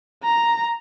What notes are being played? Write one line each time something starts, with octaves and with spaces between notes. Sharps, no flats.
A#5